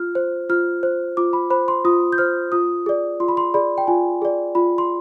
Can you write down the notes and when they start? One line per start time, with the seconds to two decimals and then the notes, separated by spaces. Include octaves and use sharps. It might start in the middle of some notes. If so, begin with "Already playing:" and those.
Already playing: F4 F6
0.15 C5
0.49 F4 F6
0.83 C5
1.17 F4 D6
1.33 B5
1.50 C5 B5
1.68 C6
1.85 F4 D#6
2.13 G6
2.18 C5 F6
2.52 F4 D#6
2.86 G#4 D5
3.20 F4 C6
3.28 B5
3.37 C6
3.54 G#4 D5 B5
3.78 G5
3.87 F4 G#5
4.22 G#4 D5
4.55 F4 B5
4.78 C6